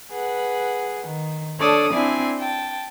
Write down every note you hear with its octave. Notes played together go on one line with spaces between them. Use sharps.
G#4 B4 F#5
D#3
D4 A4 C#5 D5 A5 D#6
C4 D4 E4 D5 G#5
G5 A5